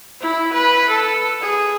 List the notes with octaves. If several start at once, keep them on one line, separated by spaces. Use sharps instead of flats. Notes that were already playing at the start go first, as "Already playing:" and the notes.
E4
B4
A4
G#4